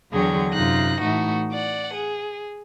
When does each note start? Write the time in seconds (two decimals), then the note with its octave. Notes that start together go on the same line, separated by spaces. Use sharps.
0.11 E2 D3 F#3 G#4 G5 C#6
0.51 F#2 C3 D#4 F4 F#6 A#6
1.01 A2 E3 A3 D#4 F#4
1.51 D5 F#5
1.93 G#4